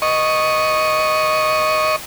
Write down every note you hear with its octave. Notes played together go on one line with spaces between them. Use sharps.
D#5 C#6